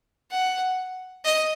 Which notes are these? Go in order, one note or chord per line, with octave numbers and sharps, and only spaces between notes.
F#5
D#5